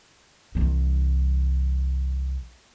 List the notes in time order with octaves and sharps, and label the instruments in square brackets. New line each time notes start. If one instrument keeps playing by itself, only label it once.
[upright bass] C2 E3